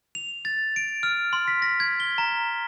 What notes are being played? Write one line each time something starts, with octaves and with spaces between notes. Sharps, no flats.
F7
A6
D7
F6
C6
B6
A#6
G#6
G7
A#5